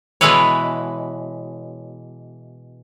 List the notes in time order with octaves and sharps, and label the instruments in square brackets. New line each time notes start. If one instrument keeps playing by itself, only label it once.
[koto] B2 E3 G#3 E4 B4 C#5